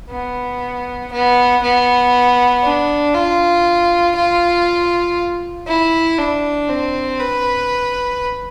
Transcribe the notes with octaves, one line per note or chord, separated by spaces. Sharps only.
B3
B3
B3
D4
F4
F4
E4
D4
C4
B4